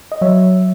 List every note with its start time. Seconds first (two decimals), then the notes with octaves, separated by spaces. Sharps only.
0.12 D#5
0.21 F#3 C#5 E5